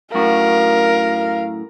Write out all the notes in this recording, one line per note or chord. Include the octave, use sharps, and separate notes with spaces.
F#2 A2 F#4 A#4 F5